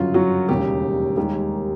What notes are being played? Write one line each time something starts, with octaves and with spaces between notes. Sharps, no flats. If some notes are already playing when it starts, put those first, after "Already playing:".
Already playing: G1 F#2 C#3 F#3 F4
F#3 F#4
E1 D#2 C#3 G3 G4
D#2 D#3 G3 G#3 G4